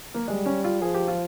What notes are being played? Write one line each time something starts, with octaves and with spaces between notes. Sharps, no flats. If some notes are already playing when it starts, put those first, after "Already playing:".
A#3
G3 G#3
C#4
F4
F3 G#4
G4
F4